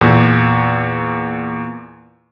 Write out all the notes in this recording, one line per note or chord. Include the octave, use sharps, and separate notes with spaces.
E2 A#2